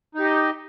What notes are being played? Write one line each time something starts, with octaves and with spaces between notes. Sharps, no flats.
D#4 G4 D#5